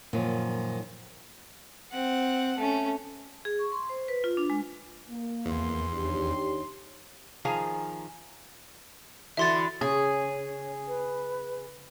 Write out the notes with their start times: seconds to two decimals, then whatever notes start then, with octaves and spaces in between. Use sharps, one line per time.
0.13 F#2 A#2 D#3 F3
1.91 C4 F#5
2.58 A3 C#4
3.45 G#4
3.59 C#6
3.72 C6
3.89 C5
4.08 B4
4.24 F4
4.37 D4
4.50 G#3
5.09 A#3
5.46 E2 C6
5.93 D#2 D4 G4
7.45 D#3 F3 G#4 F5 G#5 A#5
9.37 D3 E3 F#4 E5 C6 A6
9.81 C#3 G#4 C#5
10.88 B4